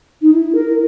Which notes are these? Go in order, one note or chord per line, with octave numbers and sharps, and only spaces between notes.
D#4
E4
A#4